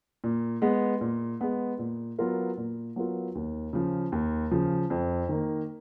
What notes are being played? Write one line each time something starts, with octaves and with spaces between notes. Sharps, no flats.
A#2
G#3 B3
A#2
G#3 B3
A#2
F#3 B3 F4 A#4
A#2
F#3 B3 F4 A#4
D#2
C#3 F3
D#2
C#3 F3
F2
D#3 A#3